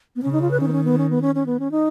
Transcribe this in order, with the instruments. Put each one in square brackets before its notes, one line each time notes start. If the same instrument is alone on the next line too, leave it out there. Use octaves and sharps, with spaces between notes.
[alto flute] B3
[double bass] C#3 [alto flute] C#4
[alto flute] D#4
F4
B4
[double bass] D#3 [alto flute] C#4
[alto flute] B3
C#4
B3
C#4
B3
C#4
C#4
B3
C#4
D#4